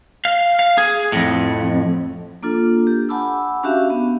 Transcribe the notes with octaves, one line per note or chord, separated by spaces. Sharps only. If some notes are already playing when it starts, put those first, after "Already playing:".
F5
F5
G#4
F2 A2
A#3 D4 F4 A4
G4
F#5 G#5 A5 B5 D6 E6
C#4 D4 F#4 G4 E5 F5
B3